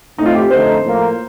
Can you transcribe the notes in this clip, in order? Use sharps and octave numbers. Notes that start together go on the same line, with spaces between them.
A2 A3 C4 D#4
F4
G4
F2 D3 A3 D#4 C5
A2 F3 A#3